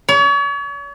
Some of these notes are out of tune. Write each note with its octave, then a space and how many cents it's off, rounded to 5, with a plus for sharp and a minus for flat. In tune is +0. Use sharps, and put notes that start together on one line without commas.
C#5 +40